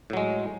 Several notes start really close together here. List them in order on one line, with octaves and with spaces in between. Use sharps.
A2 F#3 G#3